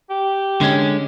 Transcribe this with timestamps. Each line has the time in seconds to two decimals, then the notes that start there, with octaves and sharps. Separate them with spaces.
0.10 G4
0.61 D3 G#3 C#4